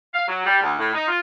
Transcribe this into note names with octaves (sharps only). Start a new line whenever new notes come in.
F5
F#3
G3
D2
A2
D#4
F4